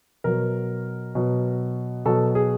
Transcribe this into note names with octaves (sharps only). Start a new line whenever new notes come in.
B2 F#3 A#4
B2 F#3
B2 F#3 A4
G#4